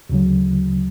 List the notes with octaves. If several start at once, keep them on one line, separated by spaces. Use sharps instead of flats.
D2 C#3 F#3